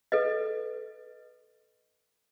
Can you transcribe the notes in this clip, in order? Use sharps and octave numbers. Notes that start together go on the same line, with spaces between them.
A4 B4 D#5